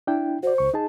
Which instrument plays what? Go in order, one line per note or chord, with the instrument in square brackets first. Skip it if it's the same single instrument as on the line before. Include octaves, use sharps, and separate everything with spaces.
[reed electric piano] D4 E4 G5
[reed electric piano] F#4 D5 [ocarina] C5
[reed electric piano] C#2 C#6
D#4 G#4 A5